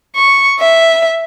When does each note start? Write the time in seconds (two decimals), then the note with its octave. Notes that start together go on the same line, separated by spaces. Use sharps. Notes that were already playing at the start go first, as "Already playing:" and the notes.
0.16 C#6
0.60 E5